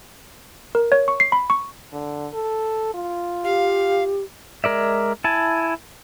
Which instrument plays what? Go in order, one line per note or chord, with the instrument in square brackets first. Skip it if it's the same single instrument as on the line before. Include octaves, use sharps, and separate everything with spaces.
[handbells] A#4
C#5
C#6
C7
B5
C#6
[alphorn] D3
A4
F4
[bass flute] G4 [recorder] F5
[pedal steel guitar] G#3 A#4 D5 E5
E4 G#5 A5